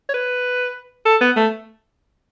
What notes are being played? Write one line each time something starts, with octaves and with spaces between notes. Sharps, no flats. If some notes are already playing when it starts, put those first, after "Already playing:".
C#5
B4
A4
B3
A3